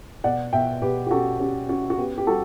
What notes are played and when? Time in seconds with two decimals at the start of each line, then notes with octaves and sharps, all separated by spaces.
0.24 B2 D5 F#5
0.53 B2 E5 G5
0.82 B2 G4 B4
1.07 G4
1.11 C#4 F#4 A4
1.40 C#4 G4
1.69 C#4 F#4
1.90 F#4
1.98 B3 G4
2.18 G4
2.27 G3 F#4 A4